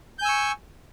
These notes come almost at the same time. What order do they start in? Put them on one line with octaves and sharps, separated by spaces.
G6 G#5 E6 C#6